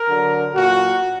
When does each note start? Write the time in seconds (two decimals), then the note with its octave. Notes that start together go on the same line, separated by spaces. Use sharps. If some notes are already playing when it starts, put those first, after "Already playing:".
Already playing: A#4
0.08 D3 F#3
0.54 A#2 F#3 F#4